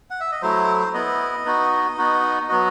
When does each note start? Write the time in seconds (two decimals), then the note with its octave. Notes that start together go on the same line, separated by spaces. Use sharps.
0.10 F#5
0.20 E5
0.32 D#5
0.42 F#3 A3 E4 C5
0.94 B3 E4 D#5
1.45 B3 D#4 F#4
1.98 B3 D#4 F#4
2.49 F#3 B3 F#4 D#5